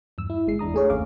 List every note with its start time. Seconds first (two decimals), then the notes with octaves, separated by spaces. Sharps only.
0.18 E2 G2 E6
0.30 E4
0.47 G1 G#3 C7
0.59 E2 D4 A#5 D#6
0.74 A3 G#4 C#5
0.90 G1 D#2 A3 C#4 F5 D6